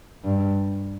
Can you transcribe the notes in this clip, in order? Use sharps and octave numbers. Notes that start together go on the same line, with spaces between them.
G2